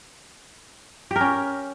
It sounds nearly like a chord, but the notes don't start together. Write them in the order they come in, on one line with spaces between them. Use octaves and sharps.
G4 A#4 C#4